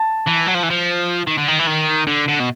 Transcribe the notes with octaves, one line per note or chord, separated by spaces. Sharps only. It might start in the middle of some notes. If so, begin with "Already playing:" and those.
Already playing: A5
E3
F#3
F3
E3
F3
D#3
D3
D#3
E3
D#3
D3
D3
B2